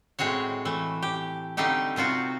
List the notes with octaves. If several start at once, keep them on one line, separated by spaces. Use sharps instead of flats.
A2 G#3 C4 F#4 C#5
E3 A3
G4
D3 G3 A3 C4 D#4 G4
C3 C4 F4 F#4